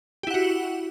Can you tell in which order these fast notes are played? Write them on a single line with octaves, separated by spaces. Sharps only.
G4 E4 F#5 F#4